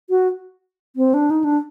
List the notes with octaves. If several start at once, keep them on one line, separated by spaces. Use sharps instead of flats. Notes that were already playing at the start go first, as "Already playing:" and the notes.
F#4
C4
D4
D#4
D4